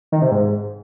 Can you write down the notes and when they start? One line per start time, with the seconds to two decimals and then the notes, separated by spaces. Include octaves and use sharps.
0.12 D#3
0.22 C3
0.31 G#2